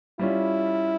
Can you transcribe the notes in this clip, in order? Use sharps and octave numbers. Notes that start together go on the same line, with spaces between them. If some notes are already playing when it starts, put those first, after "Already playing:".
G3 C#4 E4 F4